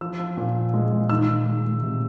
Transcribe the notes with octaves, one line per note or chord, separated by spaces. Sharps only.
F3 E6
F3
A#2
F3
G#3
A#2
D#3 E6
D#3
G#3
G#3
C3